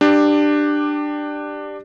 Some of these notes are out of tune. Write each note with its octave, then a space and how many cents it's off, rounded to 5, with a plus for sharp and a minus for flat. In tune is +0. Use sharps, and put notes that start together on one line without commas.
D4 +15 G4 +5